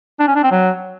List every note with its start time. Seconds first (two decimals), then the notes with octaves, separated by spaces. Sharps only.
0.20 D4
0.28 C#4
0.36 D4
0.43 C4
0.51 F#3